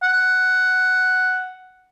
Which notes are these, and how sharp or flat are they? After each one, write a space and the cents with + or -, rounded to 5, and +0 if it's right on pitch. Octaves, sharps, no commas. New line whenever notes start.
F#5 +5